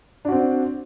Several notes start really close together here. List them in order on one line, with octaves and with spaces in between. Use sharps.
D4 F#4 C4